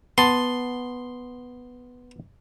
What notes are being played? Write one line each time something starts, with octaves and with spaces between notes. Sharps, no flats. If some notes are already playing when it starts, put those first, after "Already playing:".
B3 A5 C6